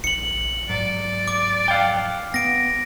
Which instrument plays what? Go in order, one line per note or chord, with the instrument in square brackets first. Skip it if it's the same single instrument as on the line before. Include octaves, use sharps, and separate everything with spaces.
[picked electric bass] A#1 [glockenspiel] C#7 F#7
[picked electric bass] G#2 F#3 [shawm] D5
[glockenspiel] D6
[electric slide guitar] F5 G5
[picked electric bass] B3 [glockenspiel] A#6 D7